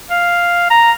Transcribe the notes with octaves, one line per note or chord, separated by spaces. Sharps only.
F5
A#5